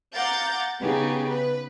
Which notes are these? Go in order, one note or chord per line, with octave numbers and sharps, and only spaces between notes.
F5 F#5 A#5 D6 G6 A6
C#3 B3 D#4 G4 G#4
B4